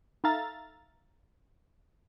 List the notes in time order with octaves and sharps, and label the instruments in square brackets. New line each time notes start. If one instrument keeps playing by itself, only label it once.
[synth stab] D#4 A4 E5 F5 A#5 A6